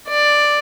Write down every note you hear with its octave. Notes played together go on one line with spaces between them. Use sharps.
D5